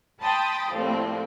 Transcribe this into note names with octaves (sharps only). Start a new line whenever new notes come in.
G5 A5 B5 C6 D#6 A6
A2 F3 G3 A#3 C4